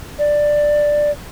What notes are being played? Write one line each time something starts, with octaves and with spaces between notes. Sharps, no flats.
D5